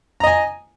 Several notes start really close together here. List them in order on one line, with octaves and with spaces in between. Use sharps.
A#5 D#5 G#5